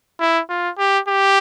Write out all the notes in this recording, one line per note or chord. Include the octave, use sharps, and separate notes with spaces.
E4
F4
G4
G4